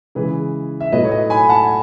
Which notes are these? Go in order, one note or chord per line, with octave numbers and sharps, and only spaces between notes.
C#3 E3 G#3 G#4 B4
E5
A2 F#3 A3 B4 D#5
C#5
B4 D#5
G#5 B5
F#5 A5